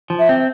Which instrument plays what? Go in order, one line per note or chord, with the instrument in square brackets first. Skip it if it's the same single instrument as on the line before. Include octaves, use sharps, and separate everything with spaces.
[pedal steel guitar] F3
[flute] E5
[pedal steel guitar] C4